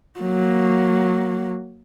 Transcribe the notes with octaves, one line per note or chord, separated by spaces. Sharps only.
F#3 A#3